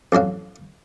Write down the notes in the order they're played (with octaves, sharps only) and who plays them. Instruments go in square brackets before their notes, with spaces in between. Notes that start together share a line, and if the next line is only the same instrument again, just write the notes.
[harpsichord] A1 F2 F#3 F5